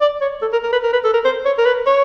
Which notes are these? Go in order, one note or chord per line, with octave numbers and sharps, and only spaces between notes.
D5
C#5
A4
A#4
A#4
B4
A#4
B4
A4
A#4
C5
C#5
A#4
B4
C#5